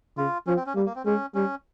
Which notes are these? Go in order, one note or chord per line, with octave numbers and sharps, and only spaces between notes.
C#3 F4
F3 C#4
C4
C#4
G3 A#3
A#3
C4
G#3 C#4
G3 C#4